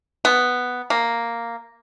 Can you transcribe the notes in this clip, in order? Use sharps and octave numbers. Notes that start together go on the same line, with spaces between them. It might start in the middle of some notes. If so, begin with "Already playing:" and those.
B3
A#3